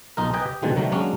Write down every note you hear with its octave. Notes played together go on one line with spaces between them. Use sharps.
B1 D#4 F4 A#4
B4 D#5 G5 G#5
G4
B2 D3 D#3 F3 G3 G#3
C3 D#3 F#3 G3 A3
F#3 G#3 A#3 C#4 D4